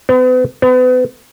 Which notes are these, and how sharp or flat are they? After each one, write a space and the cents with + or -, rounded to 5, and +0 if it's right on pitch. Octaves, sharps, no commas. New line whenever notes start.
B3 +45
B3 +40